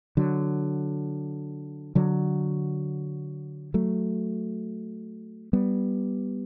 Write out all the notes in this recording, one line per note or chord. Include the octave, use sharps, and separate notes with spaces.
D3 F#3
D3 F#3
F#3 A3
G3 B3